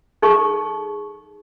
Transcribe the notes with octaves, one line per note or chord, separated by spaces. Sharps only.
D#4 G#4 A4 C#6